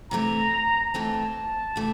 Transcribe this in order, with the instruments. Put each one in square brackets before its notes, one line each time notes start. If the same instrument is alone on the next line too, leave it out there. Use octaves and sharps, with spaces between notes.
[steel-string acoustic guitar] C3 E3 A3 C4 [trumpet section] A#5
[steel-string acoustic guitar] C3 E3 A3 C4 [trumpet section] A5
[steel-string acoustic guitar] C3 E3 A3 C4